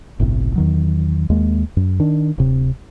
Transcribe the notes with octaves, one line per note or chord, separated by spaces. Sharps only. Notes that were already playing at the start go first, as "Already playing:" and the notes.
G1 C2 A2 C3
E2 D#3 F#3
D#2 G#3 A#3
F#2
D#3 D4
D1 C3